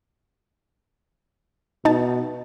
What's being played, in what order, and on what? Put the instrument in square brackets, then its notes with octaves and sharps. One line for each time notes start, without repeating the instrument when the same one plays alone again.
[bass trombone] B2 [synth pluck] D#4 A5